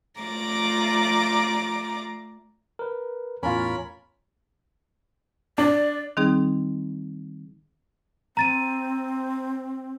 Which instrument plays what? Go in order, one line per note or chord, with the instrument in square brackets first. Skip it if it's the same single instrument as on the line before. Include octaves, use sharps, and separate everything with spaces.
[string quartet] A3 F4 D5 A#5 D6
[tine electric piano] A#4 B4
[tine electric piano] E2 A2 [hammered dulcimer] C#4 F4 [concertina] A#4 B5
[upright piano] D4 [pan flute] D5
[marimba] D#3 G3 C4 D#4 G#4
[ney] C4 [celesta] A#5 A6 D#7